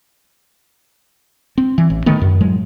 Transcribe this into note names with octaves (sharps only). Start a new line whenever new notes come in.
C4
E3
A1
D3 D#3 A3 B3
F#2
A2 F#3 G#3